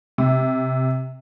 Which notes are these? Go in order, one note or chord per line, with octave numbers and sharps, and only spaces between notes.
C3